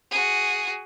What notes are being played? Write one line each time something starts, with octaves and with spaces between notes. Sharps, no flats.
F#4 G#4